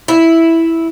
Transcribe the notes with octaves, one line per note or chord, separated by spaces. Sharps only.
E4